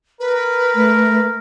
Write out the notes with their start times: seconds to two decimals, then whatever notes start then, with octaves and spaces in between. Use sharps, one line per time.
0.20 A#4 B4
0.75 A3